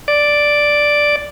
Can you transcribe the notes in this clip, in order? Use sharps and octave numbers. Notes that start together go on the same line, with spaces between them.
D5